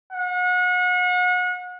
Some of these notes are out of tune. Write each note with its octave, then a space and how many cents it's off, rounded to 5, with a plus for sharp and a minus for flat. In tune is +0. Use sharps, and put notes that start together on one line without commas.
F#5 -35